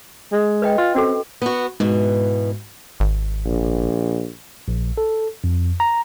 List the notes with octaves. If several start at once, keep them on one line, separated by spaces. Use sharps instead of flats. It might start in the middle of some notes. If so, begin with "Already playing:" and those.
G#3
B4 D#5 G5
F4
C4 C#4 F#4 A4
B3 F#4
G#2 B2 E3
G#1
A#1
A#1
A4
F2
A#5